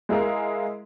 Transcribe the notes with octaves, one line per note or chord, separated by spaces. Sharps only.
G#3 E4 G#4 A#4 F5